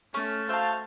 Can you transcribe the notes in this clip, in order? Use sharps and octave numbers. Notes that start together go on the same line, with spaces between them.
A3 C#4
F#4 C5 E5 F5 A5